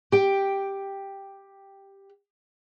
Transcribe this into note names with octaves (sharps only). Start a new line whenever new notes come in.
G4 G5